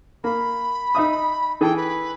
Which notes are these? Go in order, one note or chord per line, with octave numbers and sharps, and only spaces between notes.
A#3 B5
D#4 E5 D#6
E3 G#4 A4 G5
B4